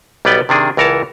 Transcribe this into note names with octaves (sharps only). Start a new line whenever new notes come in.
B1 G3 B3 B4 D5 G5
C3 D#3 D4 G#4
C#2 E3 A#4 C#5 A5